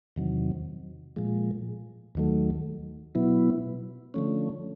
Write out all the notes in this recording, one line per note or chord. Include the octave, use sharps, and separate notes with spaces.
E2 C3 D#3 F#3
A#2 F3 G#3
D#2 D#3 F#3 A3
B2 F#3 B3 E4
D3 F3 A3 C#4